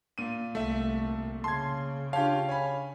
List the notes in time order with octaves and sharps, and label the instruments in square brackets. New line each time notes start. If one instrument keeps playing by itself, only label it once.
[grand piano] A#2 D#7
[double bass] C2 [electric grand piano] A3 E5
[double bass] C#3 [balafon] A5 [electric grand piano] C6 G#6
[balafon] D4 A5 [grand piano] F4 G4 C#5 [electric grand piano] F5
[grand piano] C#5 G#5 B5